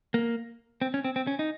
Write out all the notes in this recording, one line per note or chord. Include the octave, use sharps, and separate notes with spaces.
A#3
C4
C#4
C4
C4
C#4
D#4